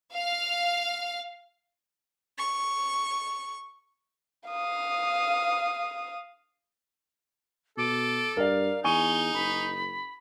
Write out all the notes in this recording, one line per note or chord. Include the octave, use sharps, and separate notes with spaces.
F5
C#6
F5 D#6
B2 A4 D6
G2 A#4 D5 F5
E2 D#4 G#5 C#6 D#7 G7
F#1 B5